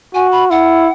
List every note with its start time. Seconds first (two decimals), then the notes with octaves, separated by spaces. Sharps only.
0.15 F#4 G#5
0.32 B5
0.50 E4 F#5